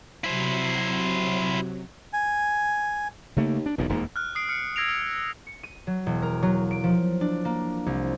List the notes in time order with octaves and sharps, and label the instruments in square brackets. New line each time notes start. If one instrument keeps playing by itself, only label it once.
[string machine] C3 F#3 [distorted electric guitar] E4 C5
[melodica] G#5
[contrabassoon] D#2 [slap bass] C#3 A3 A#3
[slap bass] D4
[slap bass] E1 E2 A#2 [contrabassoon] B1
[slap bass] D#1 F2 A#3 [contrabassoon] G#2
[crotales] F6 F#6
D#6 C7 D7
F6 C#7
E6 G#6 A#6 C7 D7 F7
E6
[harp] C#7
D#7
F#3
E1
A#4
F#3
D7
F3
D4
A#3
C2